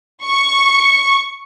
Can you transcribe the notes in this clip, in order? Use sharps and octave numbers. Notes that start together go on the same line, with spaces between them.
C#6